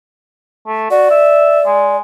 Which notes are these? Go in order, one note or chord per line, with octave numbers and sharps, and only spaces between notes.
A3
F#4 D5
E5
G#3